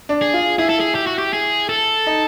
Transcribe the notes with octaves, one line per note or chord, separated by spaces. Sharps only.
D4
G#4
F4
E4 G#4
A4
G#4
G4
F#4
G4
G#4
A4
D#4